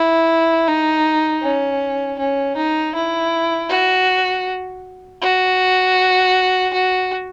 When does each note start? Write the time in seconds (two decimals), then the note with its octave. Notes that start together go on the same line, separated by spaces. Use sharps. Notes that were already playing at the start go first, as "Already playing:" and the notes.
Already playing: E4
0.68 D#4
1.42 C#4
2.19 C#4
2.56 D#4
2.95 E4
3.70 F#4
5.22 F#4
6.73 F#4